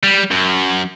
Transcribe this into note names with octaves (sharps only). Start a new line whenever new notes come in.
G3
F#2